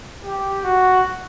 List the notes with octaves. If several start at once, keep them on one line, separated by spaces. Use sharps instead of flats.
G4
F#4